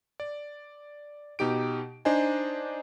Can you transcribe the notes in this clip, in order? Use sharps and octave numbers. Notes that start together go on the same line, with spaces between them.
D5
B2 D#4 G4 D7
D4 D#4 C5 D#5 G#5